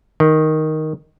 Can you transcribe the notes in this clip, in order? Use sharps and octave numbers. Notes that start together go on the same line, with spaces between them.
D#3